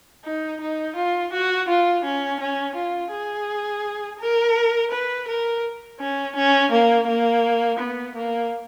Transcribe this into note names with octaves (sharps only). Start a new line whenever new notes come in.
D#4
D#4
F4
F#4
F4
C#4
C#4
F4
G#4
A#4
B4
A#4
C#4
C#4
A#3
A#3
B3
A#3